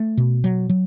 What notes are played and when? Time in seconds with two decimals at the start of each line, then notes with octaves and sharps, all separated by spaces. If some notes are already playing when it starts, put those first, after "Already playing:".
Already playing: A3
0.17 B2
0.44 F#3
0.69 F#3